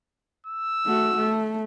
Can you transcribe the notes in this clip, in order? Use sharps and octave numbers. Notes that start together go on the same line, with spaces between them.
E6
A3 F#4
A3